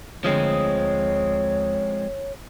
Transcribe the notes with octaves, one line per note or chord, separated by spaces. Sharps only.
D2 F3 G#3 C4 C#5 D#6